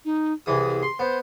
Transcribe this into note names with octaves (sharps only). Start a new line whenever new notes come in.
D#4
C2 E3 G#4 D#6
C6
B3 C5